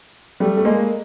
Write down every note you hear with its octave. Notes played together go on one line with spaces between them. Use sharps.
G3 A3
A3
G#3 A#3